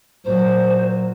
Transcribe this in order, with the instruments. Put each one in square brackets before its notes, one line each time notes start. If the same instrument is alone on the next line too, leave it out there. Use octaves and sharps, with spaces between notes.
[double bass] A#2 F#3 [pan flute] C5